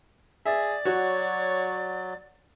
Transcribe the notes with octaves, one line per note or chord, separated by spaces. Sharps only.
G#4 D5 E5
F#3 F#4 C#5